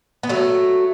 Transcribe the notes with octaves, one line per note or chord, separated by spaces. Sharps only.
B3
F#3 A3